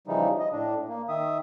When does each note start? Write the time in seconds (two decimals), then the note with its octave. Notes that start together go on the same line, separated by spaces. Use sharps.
0.07 C#3 E3 F3 G3 D#4
0.39 D#5
0.53 A2 D4
0.89 A#3
1.09 D#3 E5 D#6